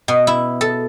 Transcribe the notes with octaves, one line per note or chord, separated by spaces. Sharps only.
B2
E4
A4